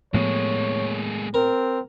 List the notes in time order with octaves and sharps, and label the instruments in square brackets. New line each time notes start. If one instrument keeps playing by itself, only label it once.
[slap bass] A2 F3 B3 [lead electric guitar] G#3 A#3 [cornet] C#5
[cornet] C4 [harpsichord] A#4